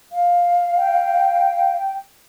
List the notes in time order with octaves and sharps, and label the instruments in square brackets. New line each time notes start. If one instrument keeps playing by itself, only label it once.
[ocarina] F5
[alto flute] G5